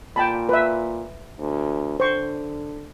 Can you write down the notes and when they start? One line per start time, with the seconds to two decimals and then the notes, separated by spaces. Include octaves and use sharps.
0.16 A#2 G5 A5 B5
0.49 B4 E5
1.39 D2
2.00 D3 C5 C#6